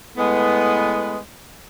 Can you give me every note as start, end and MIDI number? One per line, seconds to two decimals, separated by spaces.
0.16 1.19 45
0.16 1.19 56
0.16 1.19 59